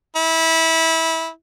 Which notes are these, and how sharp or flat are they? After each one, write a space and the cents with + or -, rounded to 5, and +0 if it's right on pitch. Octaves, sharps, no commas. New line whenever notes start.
E4 -20